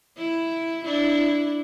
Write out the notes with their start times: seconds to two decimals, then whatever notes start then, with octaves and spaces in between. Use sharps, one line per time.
0.18 E4
0.85 D4 E4